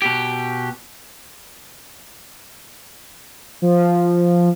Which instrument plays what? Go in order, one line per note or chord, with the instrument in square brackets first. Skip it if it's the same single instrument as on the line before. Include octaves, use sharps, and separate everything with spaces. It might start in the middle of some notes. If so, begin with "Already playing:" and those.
[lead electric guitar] B2 G4
[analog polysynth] F3